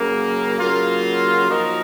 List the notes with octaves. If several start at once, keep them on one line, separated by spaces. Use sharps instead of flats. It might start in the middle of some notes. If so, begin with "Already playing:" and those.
Already playing: C#3 F#3 A#3
C#3 F#3 A#3 F4
F3 A#3 D#4 F#4 A#4